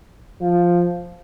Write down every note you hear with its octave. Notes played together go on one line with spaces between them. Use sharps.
F3